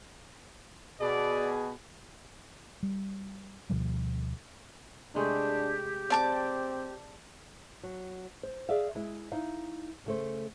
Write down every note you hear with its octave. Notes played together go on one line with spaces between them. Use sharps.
B2 G#4 D5
G3
D2 B2 F3 G3
C3 G#3 A3 D4 G4
C4 D5 A5 D6
F#3
C5
G#4 D5 E5 F5
G#3 E4 D#5
D#4 E4 F5
C#3 A3 C5